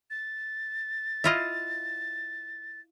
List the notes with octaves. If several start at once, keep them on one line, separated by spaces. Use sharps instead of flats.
A6
E4 F4 D#5